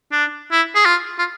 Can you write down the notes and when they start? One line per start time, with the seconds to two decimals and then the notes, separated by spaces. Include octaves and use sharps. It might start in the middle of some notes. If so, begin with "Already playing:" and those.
0.12 D4
0.52 E4
0.75 G#4
0.85 F4
1.19 F4